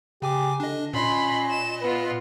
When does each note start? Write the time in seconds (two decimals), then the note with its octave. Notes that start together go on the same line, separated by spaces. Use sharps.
0.22 C#3 G4 G#5 D6
0.60 D3 D4 D#5
0.93 A#2 C#4 D#5 B5 C6
1.51 E7
1.81 B3 F4 B4